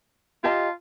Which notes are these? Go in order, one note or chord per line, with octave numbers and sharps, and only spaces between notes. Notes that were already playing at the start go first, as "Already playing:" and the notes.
F4 G4 D#5 A5